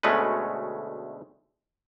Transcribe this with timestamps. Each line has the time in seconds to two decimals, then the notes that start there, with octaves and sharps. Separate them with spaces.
0.03 D2 B2 G#3 A3 C#4 B4